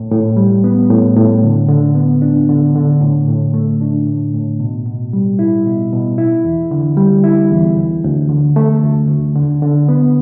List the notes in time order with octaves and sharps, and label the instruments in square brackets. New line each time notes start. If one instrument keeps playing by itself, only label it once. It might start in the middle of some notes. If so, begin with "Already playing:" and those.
Already playing: [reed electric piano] A2
A2
G3
B3
A2
A2
D3
D3
B3
D4
D3
D3
A2
A2
A3
D4
A2
A2
B2
B2
G3
E4
B2
B2
E4
E2
D3
G3
E4
E2
D2
D2
D3
A3
D2
D2
D3
D3
B3